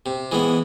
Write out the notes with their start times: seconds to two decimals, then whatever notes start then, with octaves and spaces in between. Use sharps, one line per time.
0.06 C3
0.32 E3 G#3 B3